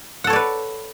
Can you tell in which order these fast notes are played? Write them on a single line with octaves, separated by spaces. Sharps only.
F#5 A4 C#5 D5 B4